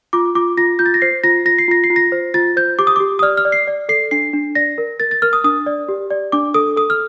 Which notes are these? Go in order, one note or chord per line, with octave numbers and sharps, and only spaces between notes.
F4 D6
F4 D6
F4 A#6
F4 G6
A6
A#6
C5 C7
F4 A#6
F4 A#6
C7
F4 A#6
C7
F4
A#6
C5
F4 A6
C5 G6
G4 D6
D#6
G4 D6
D#6
D5 F6
F6
D5
C7
D5
A4 C7
D4 C7
D4
D5 A#6
A#4
A#4 A6
A6
A#4 F6
D#6
D4 D#6
D5
G4
D5
D4 D6
A4 D#6
A4 D#6
F6